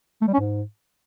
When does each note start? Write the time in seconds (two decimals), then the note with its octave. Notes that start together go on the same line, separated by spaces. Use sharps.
0.22 A3
0.28 G3
0.34 C#4
0.40 G#2